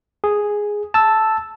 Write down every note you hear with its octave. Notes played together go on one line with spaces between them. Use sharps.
G#4
A5 E6